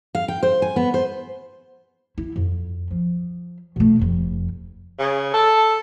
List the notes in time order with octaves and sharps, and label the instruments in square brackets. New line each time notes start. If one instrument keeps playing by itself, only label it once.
[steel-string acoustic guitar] F5
G5
C5
G#5
B3
C5
[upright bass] E4
F2
F3
B2 A3
F1 F2
[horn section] C#3
A4